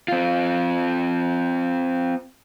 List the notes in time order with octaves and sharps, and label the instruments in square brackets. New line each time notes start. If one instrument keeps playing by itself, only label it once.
[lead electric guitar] C4 F4